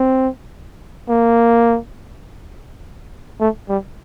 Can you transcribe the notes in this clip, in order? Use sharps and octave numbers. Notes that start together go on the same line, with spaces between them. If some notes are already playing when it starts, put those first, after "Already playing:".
Already playing: C4
A#3
A3
G3